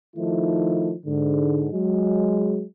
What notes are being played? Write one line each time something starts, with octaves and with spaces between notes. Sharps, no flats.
D#3 F3 A3 D#4 E4
G#2 D3
F#3 G#3